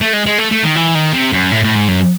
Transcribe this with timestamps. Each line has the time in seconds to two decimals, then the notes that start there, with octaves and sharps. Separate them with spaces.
0.01 A3
0.13 G#3
0.26 G#3
0.38 A3
0.51 A3
0.63 D#3
0.75 E3
0.95 D#3
1.13 C3
1.32 F#2
1.52 A2
1.64 A2
1.76 G#2
1.88 F#2